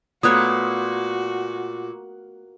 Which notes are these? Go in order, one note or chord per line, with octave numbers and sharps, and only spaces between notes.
A#2 A3 B3 F#4 C#5 D#6 F#6